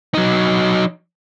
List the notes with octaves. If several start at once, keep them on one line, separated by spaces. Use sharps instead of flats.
F#3 D#4